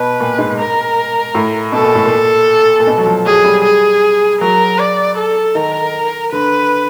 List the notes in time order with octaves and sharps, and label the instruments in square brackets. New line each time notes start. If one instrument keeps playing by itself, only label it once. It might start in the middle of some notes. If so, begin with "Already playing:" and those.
Already playing: [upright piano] B2 [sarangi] B4
[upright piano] A#2
G#2
[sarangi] A#4
[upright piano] A2
[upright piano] B2 [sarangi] A4
[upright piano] A#2
A2
A#2
A#2
B2
F#3
F3
[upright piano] F#3 [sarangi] G#4
[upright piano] G3
[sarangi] G#4
[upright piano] F#3 [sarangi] A#4
[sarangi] D5
A4
[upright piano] D#3 [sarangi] A#4
[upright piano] D3 [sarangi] B4